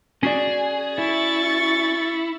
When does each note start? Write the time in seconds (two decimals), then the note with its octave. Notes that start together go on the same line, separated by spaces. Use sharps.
0.23 C#4 F#4 G#4 D5
0.98 E4 C#6 A6